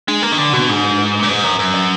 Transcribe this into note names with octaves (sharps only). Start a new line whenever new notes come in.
G#3 D4
A#3 B4
D#3
D3 D4
B2 F#4
G#2 D4
B4
B4
B4
A#2
G#2 B4
F#2 A#5
F#2 B4
D#5